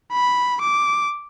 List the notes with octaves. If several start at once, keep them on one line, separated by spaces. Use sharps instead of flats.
B5
D6